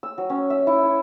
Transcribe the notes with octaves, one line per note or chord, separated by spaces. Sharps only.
E6
F#3
C#4
E5
E4
C#5